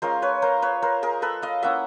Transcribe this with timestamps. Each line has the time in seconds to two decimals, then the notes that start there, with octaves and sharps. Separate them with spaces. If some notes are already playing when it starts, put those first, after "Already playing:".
0.02 G#3 C#4 F4 A#4 C5
0.22 B4 C#5
0.42 A#4 C5
0.62 B4 C#5
0.82 A#4 C5
1.03 G#4 A#4
1.22 A4 B4
1.42 D#5 F5
1.63 A#3 C#4 E4 E5 F#5